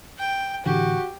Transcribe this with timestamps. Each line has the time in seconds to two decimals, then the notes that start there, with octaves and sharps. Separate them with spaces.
0.19 G5
0.66 A2 D3 E3 F#4 G4